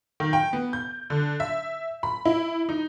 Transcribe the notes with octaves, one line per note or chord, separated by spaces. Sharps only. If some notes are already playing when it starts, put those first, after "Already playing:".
D#3
G5
B3
G6
D3
E5
B5
E4
D#4